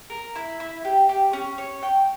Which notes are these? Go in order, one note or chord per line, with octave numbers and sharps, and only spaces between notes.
A#4
E4
E4
G4
G4
C#4
C#5
G5